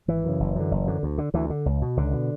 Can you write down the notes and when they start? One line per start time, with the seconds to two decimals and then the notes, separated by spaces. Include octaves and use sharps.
0.08 G#1 E3
0.24 F#2 C#3
0.40 F#1
0.55 F#2 D3
0.71 F#1
0.87 F#2 D3
1.03 D2
1.18 D3
1.34 D2 E3
1.50 D3
1.66 C#2
1.82 B2
1.97 C#2 D3
2.13 B2